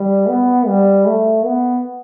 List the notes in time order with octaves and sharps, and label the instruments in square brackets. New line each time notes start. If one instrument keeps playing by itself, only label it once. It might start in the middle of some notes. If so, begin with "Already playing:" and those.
Already playing: [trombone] G3
B3
G3
A3
B3